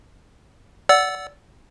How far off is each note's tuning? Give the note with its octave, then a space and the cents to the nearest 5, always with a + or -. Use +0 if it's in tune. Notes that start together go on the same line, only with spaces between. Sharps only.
D5 -20 F#5 +0 E6 +0